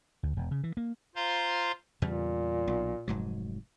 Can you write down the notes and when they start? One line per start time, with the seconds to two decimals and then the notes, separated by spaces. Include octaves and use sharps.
0.23 D2
0.37 E1
0.51 C#3
0.64 E3
0.77 A#3
1.16 F4 C5 F5 A#5 C6
2.02 E2 A#2 C#3 G3
2.68 B1
3.08 F1 G#2 F#3